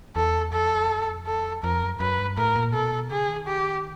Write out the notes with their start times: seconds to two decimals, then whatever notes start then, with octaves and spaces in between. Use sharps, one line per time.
0.16 E2 A4
0.52 F2 A4
0.90 F#2
1.09 F2
1.27 A4
1.63 F2 A#4
1.82 F#2
2.00 F#2 B4
2.19 G2
2.37 A2 A#4
2.55 A#2
2.73 B2 A4
3.10 C#3 G#4
3.29 D#3
3.47 G4